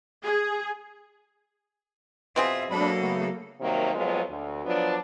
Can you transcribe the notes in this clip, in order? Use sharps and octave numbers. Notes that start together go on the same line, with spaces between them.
G#4
B2 C4 F4 G#4 E5
F#3 A#3 D4 A4 B5
C#3 A3 B3
C3 D#3 F#3 G3 A#3
F2 F#3 G#3 B3 F4
D2
F3 F#3 B3 D4